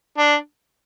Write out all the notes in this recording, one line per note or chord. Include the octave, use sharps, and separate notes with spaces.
D4